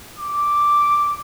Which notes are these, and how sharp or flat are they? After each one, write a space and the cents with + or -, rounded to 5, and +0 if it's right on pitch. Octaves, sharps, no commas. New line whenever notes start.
D6 +0